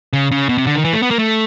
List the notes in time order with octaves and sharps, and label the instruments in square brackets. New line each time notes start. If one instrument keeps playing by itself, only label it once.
[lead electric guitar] C#3
C#3
B2
C3
D3
D#3
E3
A3
B3
A#3
A3